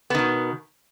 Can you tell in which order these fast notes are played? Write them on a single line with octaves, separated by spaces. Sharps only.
B3 D#3 B2